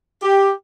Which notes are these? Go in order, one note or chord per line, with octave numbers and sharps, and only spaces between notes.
G4